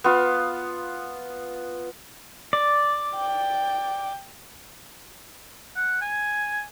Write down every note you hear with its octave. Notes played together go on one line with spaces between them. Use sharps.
B3 F4
D5
G5
F#5
G#5